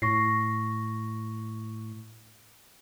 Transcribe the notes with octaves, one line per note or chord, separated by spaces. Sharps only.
A2 C#6 A#6 C7